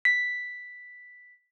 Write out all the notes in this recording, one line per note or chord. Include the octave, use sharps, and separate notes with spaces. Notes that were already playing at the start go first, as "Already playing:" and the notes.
B6